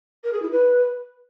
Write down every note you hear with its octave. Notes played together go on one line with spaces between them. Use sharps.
A#4
G#4
E4
B4